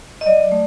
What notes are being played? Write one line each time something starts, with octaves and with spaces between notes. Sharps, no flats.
D#5
F#3 D5
A3